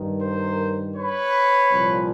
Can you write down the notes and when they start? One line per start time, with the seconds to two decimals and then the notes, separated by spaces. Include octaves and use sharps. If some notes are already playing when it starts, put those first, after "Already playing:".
Already playing: G2 D#3
0.22 A#4 C5
0.96 B4 C#5
1.71 C2 A#2 F3